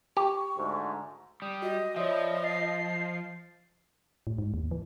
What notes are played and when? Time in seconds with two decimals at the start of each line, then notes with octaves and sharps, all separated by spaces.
0.17 G4 C#6
0.57 D2 G#2
1.42 G3 D#6
1.62 F#4 D#5
1.96 F3 C#5 D5 E5
2.11 B5
2.44 A6 C7
4.27 A2
4.38 G#2
4.54 D#2
4.71 E3